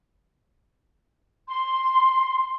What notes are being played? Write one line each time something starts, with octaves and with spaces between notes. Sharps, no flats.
C6